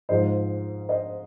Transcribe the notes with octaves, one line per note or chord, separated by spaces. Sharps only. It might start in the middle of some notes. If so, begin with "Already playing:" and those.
G#2 F3 G#3 C5 D#5
C5 D#5